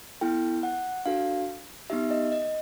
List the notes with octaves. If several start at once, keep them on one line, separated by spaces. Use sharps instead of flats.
B3 E4 A4 G5
F#5
D4 F#4 A4 F5
B3 D#4 G4 E5
D#5
D#5